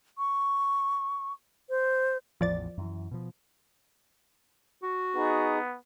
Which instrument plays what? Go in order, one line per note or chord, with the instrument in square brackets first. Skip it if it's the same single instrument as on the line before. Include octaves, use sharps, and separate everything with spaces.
[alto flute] C#6
C5
[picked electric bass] A1 E2 [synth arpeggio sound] F3 D5 A6
[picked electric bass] F#2 E3
B2 F3
[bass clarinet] F#4
[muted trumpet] B3 [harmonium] D#4 G#4